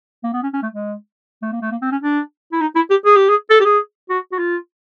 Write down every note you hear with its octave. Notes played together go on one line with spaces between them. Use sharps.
A#3
B3
C#4
C#4
A3
G#3
A3
A#3
A3
A#3
C4
C#4
D4
E4
D#4
E4
G4
G#4
G4
G#4
A4
G4
G#4
F#4
F#4
F4